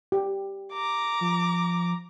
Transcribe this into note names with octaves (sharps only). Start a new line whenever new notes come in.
G4
A#5 D6
F3